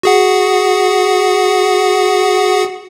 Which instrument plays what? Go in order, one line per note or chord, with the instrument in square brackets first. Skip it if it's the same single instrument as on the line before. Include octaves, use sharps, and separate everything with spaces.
[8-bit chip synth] F#4 G#4 F#5